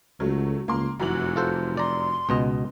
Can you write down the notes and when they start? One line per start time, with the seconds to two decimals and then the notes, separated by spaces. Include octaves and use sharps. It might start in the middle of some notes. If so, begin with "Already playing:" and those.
0.20 C#2 F#3 A3
0.68 C#2 A#3 C6
1.00 F1 F#2 E3 F#4 F#7
1.36 F4 A4 C5
1.77 D5 A#5 C6
2.29 C#2 B2 D#5